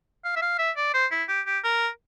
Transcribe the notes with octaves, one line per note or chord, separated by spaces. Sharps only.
F5
E5
F5
E5
D5
C5
E4
G4
G4
A#4